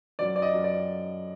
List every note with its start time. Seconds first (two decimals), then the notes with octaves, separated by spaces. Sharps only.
0.19 F#2 D5
0.36 D5
0.42 D#5
0.53 F#2
0.64 D5